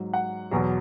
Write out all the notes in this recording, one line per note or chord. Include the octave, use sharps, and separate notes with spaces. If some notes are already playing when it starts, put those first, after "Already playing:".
Already playing: G#2 F#3
F#5
E2 B2 F#3